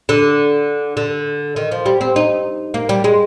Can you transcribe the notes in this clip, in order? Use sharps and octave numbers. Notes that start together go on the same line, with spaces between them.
D3
D3
D#3
F3
G3
C4
D#4
A#3
G3
G#3